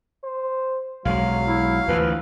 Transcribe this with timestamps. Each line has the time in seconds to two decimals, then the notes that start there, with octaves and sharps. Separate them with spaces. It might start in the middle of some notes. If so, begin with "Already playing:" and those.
0.24 C5
1.05 B1 F#3 G#3 F5
1.47 E4
1.88 D2 E3 F3 B4